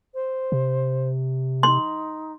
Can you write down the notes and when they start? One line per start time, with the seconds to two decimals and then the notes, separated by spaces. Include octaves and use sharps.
0.14 C5
0.52 C3
1.63 D#4 C6